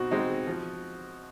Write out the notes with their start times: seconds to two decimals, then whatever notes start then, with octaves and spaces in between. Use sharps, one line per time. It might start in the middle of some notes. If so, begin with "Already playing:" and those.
Already playing: B2 C4 D#4 F#4
0.11 G#3 C4 D#4
0.47 F3